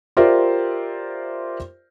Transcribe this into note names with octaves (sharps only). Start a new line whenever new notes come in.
F4 G4 A#4 C5 D5 E5